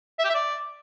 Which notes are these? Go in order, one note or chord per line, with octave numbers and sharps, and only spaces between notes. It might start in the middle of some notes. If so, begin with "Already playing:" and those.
E5
G4
E5
D5